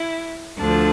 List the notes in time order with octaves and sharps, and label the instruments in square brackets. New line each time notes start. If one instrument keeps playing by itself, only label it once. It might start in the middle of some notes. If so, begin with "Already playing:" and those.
Already playing: [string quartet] E4
D2 D3 F3 D4